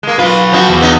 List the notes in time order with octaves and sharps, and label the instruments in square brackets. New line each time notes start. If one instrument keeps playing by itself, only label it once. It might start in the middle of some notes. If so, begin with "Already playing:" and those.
[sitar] G#3 A#3
[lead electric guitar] F#3 B4 [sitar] F4
[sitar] F3 D#4 F#4
[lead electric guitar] E2
[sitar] B3 D#4